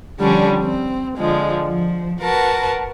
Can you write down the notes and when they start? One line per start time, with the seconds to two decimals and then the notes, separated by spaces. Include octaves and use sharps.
0.19 D3 F3 G3 C#4 D4
0.59 C4
1.17 D3 F3 G#3
1.67 F3
2.20 F#4 A#4 B4 A5